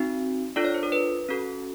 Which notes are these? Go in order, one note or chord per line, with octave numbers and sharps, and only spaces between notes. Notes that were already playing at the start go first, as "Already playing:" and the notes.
Already playing: C4 D#4 F#4
D4 F4 A4 D5
C#5
C5
A#4
B4
C#4 F#4 A4